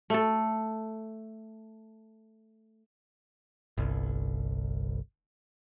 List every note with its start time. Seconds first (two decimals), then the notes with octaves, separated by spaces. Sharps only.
0.10 A3 A4
3.77 G1 C2